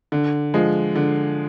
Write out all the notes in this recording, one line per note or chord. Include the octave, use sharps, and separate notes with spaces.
D3
F3 G#3
D3